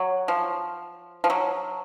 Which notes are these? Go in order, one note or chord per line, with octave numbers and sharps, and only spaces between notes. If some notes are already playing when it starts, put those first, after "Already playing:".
Already playing: F#3
F3
F3
F#3